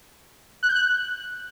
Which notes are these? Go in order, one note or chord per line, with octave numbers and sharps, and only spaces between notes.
F#6
G6
F#6